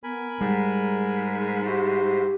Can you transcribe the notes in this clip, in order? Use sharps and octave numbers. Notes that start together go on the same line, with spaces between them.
B3 A#4 G#5 B5
G#2 G3 G#3
E4 F#4 G4 C5